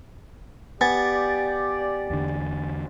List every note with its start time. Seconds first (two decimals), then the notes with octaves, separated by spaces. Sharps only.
0.81 B3 G4 D5 G#5 A6
2.10 E2 D3